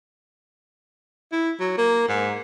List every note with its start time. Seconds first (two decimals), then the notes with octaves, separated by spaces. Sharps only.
1.32 E4
1.60 F#3
1.78 A#3
2.08 G#2